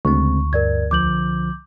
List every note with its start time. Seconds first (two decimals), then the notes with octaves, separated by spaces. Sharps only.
0.05 D2 C#3 G#3 C4 C#6
0.53 G2 A#4 D5 G#6
0.91 C2 D3 F3 D6 G6 F#7